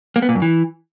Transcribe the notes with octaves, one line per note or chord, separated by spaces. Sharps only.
A#3
B3
A#2
F#2
E3